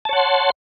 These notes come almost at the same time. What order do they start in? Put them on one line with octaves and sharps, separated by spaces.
A5 C#5 F#5 C6